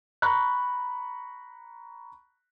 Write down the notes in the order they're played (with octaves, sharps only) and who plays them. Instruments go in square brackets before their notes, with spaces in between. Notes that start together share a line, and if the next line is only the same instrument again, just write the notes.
[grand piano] A#5 B5 C#6 F#6